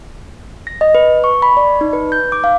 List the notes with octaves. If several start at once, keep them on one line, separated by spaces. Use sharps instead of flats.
A#6
D#5
B4
C#6
B5
D5
D#4
B4
G6
D6
F5